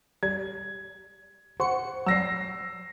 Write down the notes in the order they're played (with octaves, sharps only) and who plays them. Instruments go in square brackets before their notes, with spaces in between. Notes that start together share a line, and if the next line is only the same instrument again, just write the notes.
[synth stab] G3 [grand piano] G#6
[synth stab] C5 C#7 [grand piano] F#5 C#6
[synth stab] F#3 G3 [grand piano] E6 A#6 C7